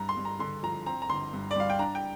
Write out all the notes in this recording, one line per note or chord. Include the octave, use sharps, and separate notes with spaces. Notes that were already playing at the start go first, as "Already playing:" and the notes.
Already playing: G2 A#5
C6
G2
A#5
D3 C6
F3 A#5
C4 A#5
A#5
G1 C6
G2
D5
G3 F5
G5
D4 A#5
G5